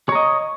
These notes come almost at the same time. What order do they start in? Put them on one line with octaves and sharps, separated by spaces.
C#5 A#5 D#5